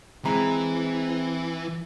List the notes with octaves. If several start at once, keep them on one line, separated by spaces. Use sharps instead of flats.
E3 G#3 C4 A#5